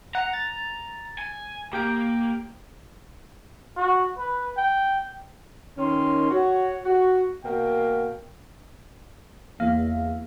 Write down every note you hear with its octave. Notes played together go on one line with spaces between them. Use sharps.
F#5 A#5
A6
G#5
A#3 G4 G5 D7
F#4
B4
G5
D#3 C#4 C6
F#4 C#5
F#4
B2 A#3 F#4 A#4 F5 G5
E2 A#3 F5